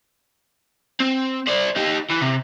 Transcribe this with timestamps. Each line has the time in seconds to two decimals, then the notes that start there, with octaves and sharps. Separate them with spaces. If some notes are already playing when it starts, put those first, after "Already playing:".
1.00 C4
1.47 C5 D5
1.76 D#4 G4
2.10 E3
2.21 C3